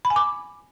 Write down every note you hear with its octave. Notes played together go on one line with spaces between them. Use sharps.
B5
G#5
D6